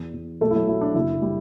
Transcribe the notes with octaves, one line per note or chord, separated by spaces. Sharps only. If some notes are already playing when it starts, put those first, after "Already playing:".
Already playing: E2
E2
B1 A3 A4
E4
F#3 F#4
F#3 E4
D4
F#1 E4
G3